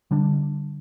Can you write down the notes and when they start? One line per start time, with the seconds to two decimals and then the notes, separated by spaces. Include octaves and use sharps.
0.11 D3 G3 D4